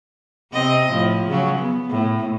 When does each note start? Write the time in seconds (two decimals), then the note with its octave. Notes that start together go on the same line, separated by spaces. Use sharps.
0.53 C3 C4 D#5
0.91 A2 F3
1.27 C#3 F#3
1.59 B3
1.90 A2